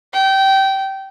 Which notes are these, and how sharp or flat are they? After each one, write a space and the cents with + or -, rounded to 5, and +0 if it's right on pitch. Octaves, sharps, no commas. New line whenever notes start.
G5 -20